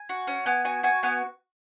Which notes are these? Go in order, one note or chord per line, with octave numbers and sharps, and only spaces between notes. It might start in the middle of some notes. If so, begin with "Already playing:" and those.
Already playing: G#5
F#4
C#4
B3 G#5
F#4 G#5
F#4 G#5
B3 G#5